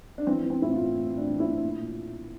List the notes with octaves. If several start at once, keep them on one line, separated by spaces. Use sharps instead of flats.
D4
E3 C4
E3
C4
A2 E4
F4
A2
A2
A2
D4
E3
E4
A2
A#2
A#2